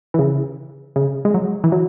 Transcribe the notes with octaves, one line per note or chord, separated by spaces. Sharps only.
E3
C#3
C#3
G#3
F#3
E3
F#3